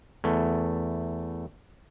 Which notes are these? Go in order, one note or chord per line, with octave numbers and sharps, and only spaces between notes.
E2 A3